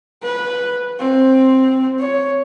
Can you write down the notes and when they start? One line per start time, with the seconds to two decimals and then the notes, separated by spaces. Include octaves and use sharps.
0.23 B4
1.00 C4
2.00 C#5